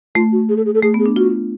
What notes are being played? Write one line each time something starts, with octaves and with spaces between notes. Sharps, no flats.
A3 F4
F#4
G#4
A4
G#4
A4
A3 G#4
B3
G#4
D4
F4 F#4